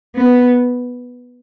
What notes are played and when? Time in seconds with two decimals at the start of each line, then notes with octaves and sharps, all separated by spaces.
0.15 B3